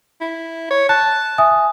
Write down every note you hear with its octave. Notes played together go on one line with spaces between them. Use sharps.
E4
C#5
A5 F#6
E5 G#5 D#6